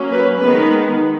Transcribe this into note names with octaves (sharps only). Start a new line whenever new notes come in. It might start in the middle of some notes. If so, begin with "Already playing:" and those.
Already playing: F#3 A#3 C#4
B4
D#3 G#3 B3 B4